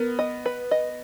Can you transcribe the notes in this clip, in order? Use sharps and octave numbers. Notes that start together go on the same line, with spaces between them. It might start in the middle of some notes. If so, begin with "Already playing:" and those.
Already playing: B3 A#4
D#5
B4
D#5